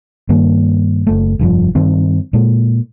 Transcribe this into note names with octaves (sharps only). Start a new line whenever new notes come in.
G2 D#3 A#3
F#1 A3
F1 G2 F3
G2 D#3 C4
A#2 G#3